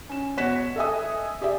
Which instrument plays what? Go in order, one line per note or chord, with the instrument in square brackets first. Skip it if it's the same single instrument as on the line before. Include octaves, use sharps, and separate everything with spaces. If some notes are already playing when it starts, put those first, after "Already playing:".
[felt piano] C#4 E7
B2 F#4 C#5 F#6 B6 E7
A4 D#5 E5 G#5 D#6
G4 G#4 D5 E5